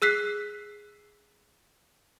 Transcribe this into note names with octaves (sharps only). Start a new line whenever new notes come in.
G#4 E6 F#6 B6 C7